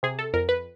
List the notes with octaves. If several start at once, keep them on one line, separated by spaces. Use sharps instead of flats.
C3 G#4
A4
F2 A#4
B4